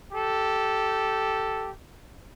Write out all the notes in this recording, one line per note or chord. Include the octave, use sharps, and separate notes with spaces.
G4 A4